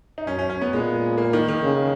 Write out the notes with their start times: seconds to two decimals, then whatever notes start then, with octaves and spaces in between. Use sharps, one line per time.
0.18 D#4
0.27 F#2 C#4
0.39 C#4
0.50 C#4
0.62 B3
0.73 A#2 G#3
1.18 A#3
1.33 D#3
1.48 D#3
1.63 C#3